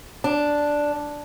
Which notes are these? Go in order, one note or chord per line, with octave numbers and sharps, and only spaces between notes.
D4